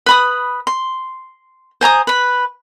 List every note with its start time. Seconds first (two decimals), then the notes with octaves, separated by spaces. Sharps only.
0.06 B4 B5 D#6
0.67 C6
1.81 C5 G#5 A#5 D#6
2.07 B4 B5